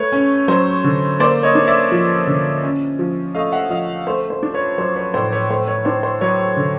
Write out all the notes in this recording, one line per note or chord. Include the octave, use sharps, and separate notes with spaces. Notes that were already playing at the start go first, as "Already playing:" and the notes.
Already playing: A3 B4 C#5
C#4
F#3 C5
D3
A#3 C5 D5
C#5 D#5
D4
D5 E5
F3
D3
C#4
F3
A3 D#5 F5
E5 F#5
F3 D#5 F5
A3 C5
C5
D4
B4 C#5
F#3 C5
B4 C#5
A2 C5 D5
B4 C#5
A3 C5
B4 C#5
D4 C5
C5
F#3 B4 C#5
D3